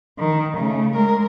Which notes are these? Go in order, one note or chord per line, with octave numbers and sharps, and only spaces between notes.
D#3
C#3 A3
G#3 A#4